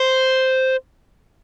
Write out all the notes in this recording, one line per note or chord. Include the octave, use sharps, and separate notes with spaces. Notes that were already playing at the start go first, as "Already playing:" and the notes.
Already playing: C5